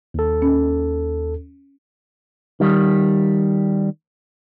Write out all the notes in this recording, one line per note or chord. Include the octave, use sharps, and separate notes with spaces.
D#2 A4
C#4
D#3 G3